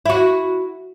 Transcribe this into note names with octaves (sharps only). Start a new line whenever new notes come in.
E4 F#4